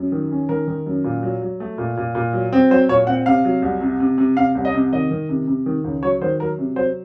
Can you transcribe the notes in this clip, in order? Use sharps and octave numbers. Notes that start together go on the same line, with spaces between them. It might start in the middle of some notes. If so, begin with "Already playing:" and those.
Already playing: F#2
D#3
C#4
D#3 A#4
D#3
F#2
A#2
F#3
F#3
A3
A#2
A#2
A#2
F#3
C4
F#3 C5
A#2 C#5
C4 F#5
C3 F5
F#3
C2
C3
C3
C3
C3 F5
C2
D#5
C3
D#3 D#5
D#3
C3
C3
D#3
C#2
F#3 C#5
D#3 C5
F#3 A#4
C3
F#3 C5